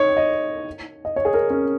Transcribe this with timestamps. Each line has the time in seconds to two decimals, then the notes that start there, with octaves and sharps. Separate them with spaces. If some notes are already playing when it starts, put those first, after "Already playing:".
Already playing: D#4 C#5
0.17 D#5
1.05 D#5
1.16 C#5
1.25 G#4
1.34 A#4
1.50 C#4